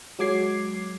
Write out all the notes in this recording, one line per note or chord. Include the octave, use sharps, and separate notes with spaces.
F#3 G#3 D6 G#6 C7